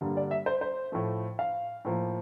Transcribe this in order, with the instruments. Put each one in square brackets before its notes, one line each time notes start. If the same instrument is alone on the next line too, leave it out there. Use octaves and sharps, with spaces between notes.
[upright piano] G2 D3 G3 A#3
D5
E5
C5
C5
A2 F3 A3
F5
A2 F3 A#3